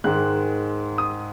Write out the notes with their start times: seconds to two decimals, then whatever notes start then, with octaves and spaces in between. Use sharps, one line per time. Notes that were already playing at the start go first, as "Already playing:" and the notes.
0.04 G#2 D#3 G#3 F#6
0.98 D#6